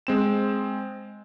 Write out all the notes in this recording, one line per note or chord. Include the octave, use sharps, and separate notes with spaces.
G#3 C4 E7